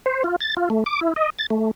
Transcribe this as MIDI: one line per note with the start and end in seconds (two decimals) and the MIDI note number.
0.06 0.23 72
0.24 0.36 65
0.41 0.54 93
0.57 0.69 65
0.70 0.84 57
0.86 1.00 86
1.01 1.14 64
1.16 1.30 75
1.39 1.46 93
1.50 1.71 57